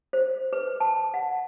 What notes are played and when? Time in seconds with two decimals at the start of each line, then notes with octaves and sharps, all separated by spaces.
0.13 C5
0.53 B4
0.80 A5
1.14 F#5